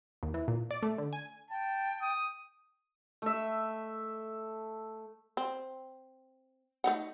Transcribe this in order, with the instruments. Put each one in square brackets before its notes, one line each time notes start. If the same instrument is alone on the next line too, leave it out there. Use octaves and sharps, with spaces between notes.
[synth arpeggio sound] D#2
E3
A#2
D5
A3
D3
G#5
[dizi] G5 [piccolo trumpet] A5
[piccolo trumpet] D#6
[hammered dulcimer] A3 E5
[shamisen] C4
A3 D#4 F#5